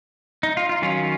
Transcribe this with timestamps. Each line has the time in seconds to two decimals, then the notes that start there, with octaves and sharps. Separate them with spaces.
0.43 D#4
0.57 F4
0.69 F4
0.82 D#3 F#3 C#4 F4